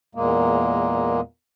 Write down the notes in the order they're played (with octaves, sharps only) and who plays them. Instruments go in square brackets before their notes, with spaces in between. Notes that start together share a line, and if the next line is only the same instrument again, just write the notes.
[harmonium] E2 A#2 G#3 A#3